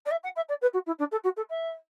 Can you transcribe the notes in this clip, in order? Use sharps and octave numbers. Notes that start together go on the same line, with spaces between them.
D5
E5
F#5
E5
D5
B4
F#4
E4
D4
A4
F#4
A4
E5